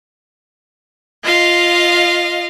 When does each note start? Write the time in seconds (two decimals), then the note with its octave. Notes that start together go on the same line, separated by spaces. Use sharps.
1.23 F4 D#5 F5